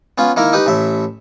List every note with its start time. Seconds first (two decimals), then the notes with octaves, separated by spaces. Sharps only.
0.18 B3 C#4 F4
0.37 D#3 A#3 E4 A#4
0.53 D#4 G4 B4
0.66 A1 A2 E5